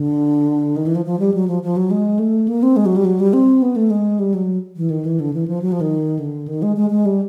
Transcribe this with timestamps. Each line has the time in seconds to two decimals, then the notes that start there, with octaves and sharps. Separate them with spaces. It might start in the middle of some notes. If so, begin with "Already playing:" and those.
Already playing: D3
0.76 D#3
0.86 E3
0.95 F3
1.05 F3
1.19 G3
1.34 F#3
1.48 F3
1.63 F3
1.77 F#3
1.91 G#3
2.19 A3
2.48 A#3
2.63 C4
2.76 G#3
2.86 F#3
2.96 G3
3.05 F#3
3.20 G3
3.33 C4
3.62 B3
3.76 A3
3.90 G#3
4.19 G3
4.34 F#3
4.77 E3
4.90 D#3
5.05 E3
5.20 D3
5.34 E3
5.48 F3
5.62 F#3
5.72 F3
5.81 D#3
6.19 D3
6.48 D#3
6.62 G#3
6.76 G#3
6.90 G#3
7.06 G3